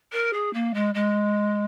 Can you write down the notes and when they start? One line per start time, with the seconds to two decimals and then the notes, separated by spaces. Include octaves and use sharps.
0.13 A#4
0.34 G#4
0.54 A#3
0.74 G#3
0.94 G#3